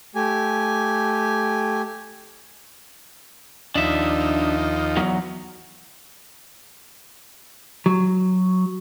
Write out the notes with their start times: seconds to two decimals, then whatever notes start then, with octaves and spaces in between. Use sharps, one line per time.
0.15 A3 G4 G#5
3.75 D#2 F3 D4 D#4 E5
4.97 E2 F#3
7.86 F#3